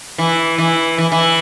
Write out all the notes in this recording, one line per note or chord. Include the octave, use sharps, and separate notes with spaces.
E3
E3
E3
E3